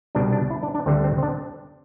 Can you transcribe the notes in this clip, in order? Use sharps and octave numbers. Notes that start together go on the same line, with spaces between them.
C2 B2 G3 D4
D4
E4
D4
D4
D2 D3 G3 C4
C4
C4
D4